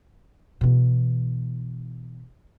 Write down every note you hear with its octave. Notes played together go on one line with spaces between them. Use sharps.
B2 E3